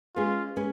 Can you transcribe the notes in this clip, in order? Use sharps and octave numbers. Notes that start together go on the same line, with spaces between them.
G#3 C#4 F4 G#4 B4
G#3 C#4 G#4 B4